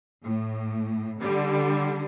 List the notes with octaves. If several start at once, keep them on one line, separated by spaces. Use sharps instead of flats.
A2
D3 G3